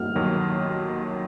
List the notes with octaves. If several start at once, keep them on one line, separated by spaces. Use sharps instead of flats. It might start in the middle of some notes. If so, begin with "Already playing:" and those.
Already playing: F6
D#2 D#3 F#3